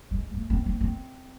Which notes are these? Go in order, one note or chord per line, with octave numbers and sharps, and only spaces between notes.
G#3
A3
C4
C4
C4